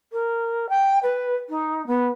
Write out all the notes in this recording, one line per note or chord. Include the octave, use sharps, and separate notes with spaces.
A#4
G5
B4
D#4
B3